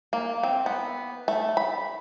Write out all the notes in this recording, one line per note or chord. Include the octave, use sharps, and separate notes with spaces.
A#3
C4
B3
A3
B5